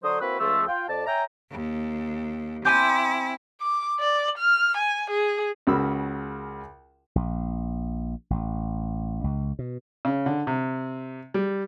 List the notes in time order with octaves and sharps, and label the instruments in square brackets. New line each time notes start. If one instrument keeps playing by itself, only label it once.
[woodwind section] D3 F#3 C5 D#6
A#3 C4 E4 F#4 B4
C#2 F3 A3 E6
F4 G5
F2 D5 A5
C#5 E5 G5 G#5 A#5
[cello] D#2
[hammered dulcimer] C4 [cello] E4 [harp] G#5 D6 G6
[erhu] D6
D5
F6
G#5
G#4
[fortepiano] C#2 C#3 F#4 A#4 B5 E6
[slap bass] A#1
A1
C#2
B2
[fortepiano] C#3
D3
C3
G3